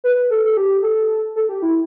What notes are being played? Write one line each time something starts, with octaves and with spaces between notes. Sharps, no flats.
B4
A4
A4
G4
A4
A4
G4
E4